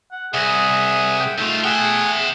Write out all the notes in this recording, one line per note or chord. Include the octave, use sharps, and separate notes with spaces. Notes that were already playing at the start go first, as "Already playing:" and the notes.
F#5
C2 G#4 E5 F#5
G5
D#3 A3 F4
G#4 E5 F#5 G5